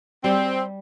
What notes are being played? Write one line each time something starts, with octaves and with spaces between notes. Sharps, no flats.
G3 C4